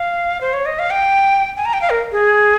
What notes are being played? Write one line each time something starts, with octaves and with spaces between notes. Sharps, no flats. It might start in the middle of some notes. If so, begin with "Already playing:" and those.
Already playing: F5
C5
C#5
D#5
F5
G5
G#5
A#5
G5
F5
A#4
G#4